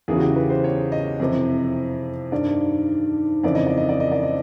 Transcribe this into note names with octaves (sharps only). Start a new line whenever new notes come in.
E2 C#3 E3 G#4
F#4
G4
B4
C5
C#5
D#5
F2 C3 E3
G2 D#3 D5
F2 C#3 E3 D5
D#5
D5
D#5
D5
D#5
D5
D#5